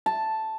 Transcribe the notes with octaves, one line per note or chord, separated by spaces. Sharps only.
A5